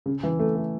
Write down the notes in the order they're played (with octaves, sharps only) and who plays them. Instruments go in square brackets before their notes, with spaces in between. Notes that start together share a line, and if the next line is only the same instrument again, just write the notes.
[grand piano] C#3
E3
A3
A3